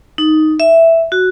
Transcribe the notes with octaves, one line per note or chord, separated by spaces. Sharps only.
D#4
E5
F#4